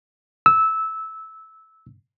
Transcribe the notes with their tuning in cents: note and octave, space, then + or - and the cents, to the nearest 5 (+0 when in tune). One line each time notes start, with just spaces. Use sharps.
E6 -15